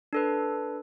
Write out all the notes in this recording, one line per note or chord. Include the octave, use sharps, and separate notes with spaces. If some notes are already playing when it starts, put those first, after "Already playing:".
D4 A4 B4